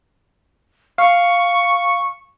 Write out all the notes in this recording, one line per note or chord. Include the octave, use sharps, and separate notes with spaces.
F5 C#6